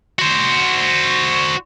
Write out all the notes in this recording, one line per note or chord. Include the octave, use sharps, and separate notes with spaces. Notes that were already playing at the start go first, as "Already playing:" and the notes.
F#4 C5